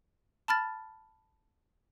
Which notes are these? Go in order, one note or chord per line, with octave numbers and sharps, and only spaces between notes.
A5 B5 F6 A6